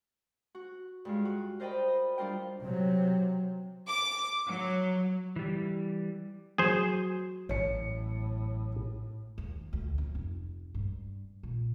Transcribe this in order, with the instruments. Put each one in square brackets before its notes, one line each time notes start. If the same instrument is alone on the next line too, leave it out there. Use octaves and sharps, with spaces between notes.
[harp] F#4
G2 G#3 F4
F#4
A#4 C5 D5 D#5 G5 B5
D#5
G3 D4 F4 A#4 G5
[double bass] C3 F#3
[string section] D6
F#3
[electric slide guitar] E3 G3
[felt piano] F#3 [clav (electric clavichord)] G#4 C5
[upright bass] A1 F#3 [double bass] A2 [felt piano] C#5 C#7
[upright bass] D#2
D2
F2
F1
G2
A#2